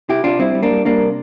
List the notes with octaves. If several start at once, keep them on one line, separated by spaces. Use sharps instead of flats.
C3 E4 G4
C3 D4 F4
G3 C4 E4
G3
A#3 D4
G3
G3 A#3 D4
C3